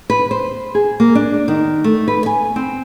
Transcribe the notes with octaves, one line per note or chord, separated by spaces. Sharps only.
B4
C5
G#4
A#3
D4
D#3
A3
B4
G#5
C4